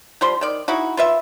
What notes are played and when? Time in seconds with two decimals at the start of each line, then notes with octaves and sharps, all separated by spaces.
0.21 F3 G3 C6
0.41 D#3 D5
0.68 D#4 E4 F#4
0.97 F4 B4 E5